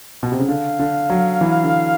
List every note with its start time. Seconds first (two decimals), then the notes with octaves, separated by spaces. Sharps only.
0.23 B2
0.32 C3
0.39 C#3
0.49 D3 F5
0.79 D3
1.10 F#3
1.41 E3
1.64 D3